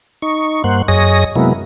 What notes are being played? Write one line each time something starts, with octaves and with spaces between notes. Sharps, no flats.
D#4 C#6
G2 A#3 C5 F#5
F#2 G#4 C#5 D#5 A#6
C3 F#3 G#3 A#3 B3 E4